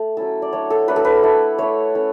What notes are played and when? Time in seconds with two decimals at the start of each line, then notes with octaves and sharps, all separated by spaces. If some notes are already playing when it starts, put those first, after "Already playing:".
Already playing: A3
0.17 F#3 C#4 E4 A4
0.42 D5
0.53 F#3 A3 D4 C#5
0.70 A4
0.88 F#3 A3 D4 B4
0.96 A4
1.05 B4
1.23 A3 E4
1.58 A3 E4 C#5
1.94 A3 C#4 E4